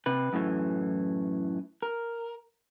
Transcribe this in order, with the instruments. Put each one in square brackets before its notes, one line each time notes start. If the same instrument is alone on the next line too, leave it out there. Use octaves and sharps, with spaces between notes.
[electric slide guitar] C3 B4
F#2 A2 E3
A#4